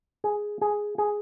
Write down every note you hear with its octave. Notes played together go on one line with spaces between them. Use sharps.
G#4
G#4
G#4